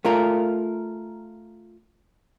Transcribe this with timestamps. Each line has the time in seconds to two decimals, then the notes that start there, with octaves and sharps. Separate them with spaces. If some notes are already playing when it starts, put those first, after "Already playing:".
0.05 A3 F4 A#4